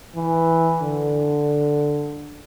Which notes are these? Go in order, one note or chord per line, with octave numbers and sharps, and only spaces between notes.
E3
D3